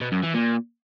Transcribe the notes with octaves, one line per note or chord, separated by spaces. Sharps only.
B2
F#2
E3
A#2